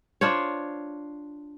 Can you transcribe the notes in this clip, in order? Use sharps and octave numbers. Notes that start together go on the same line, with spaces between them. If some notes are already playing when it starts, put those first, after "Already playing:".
D4 F4 C5 C#5